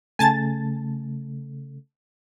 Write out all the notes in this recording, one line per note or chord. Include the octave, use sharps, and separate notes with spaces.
C#3 A3 G#5 A5 A6